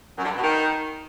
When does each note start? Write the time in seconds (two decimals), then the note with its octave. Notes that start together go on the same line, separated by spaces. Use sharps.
0.18 F#2
0.24 D3
0.30 G2
0.36 B2
0.43 D#3